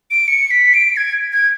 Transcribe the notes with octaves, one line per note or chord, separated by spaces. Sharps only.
D7
C#7
B6
D7
G#6
G#6